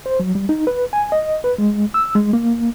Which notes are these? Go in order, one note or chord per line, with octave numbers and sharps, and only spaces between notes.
C5
F#3
G3
D#4
B4
G#5
D#5
B4
G#3
E6
G#3
A#3